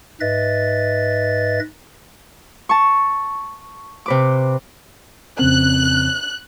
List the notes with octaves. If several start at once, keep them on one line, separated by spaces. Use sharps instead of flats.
G#2 B4 D#5 E5 A6
A5 C#6
C3 B4 D6
F2 C#3 C4 F#6